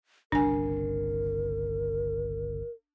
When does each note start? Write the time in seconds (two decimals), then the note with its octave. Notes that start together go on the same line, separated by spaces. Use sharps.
0.32 G1 C2 C#3 D4 A#4 G#5